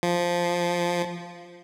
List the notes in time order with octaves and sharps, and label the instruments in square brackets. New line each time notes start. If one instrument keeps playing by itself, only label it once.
[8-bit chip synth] F3